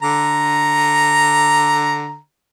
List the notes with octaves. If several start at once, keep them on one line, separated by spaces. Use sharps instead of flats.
D3 A#5